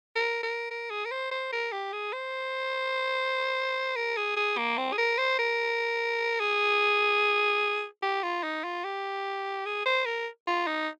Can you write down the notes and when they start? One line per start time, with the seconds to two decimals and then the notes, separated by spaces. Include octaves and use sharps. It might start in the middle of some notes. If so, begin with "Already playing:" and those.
0.16 A#4
0.43 A#4
0.70 A#4
0.90 G#4
1.05 A#4
1.11 C5
1.31 C5
1.52 A#4
1.72 G4
1.92 G#4
2.13 C5
3.96 A#4
4.17 G#4
4.36 G#4
4.57 A#3
4.78 C4
4.92 G#4
4.98 A#4
5.18 C5
5.39 A#4
6.40 G#4
8.02 G4
8.23 F4
8.43 D#4
8.64 F4
8.84 G4
9.66 G#4
9.86 C5
10.06 A#4
10.47 F4
10.67 D#4